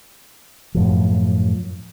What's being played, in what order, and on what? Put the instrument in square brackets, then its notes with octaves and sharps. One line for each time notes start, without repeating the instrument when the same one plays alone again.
[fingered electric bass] F#2 A2 F3